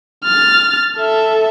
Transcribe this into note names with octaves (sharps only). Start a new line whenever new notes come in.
F6 A6
A4 E5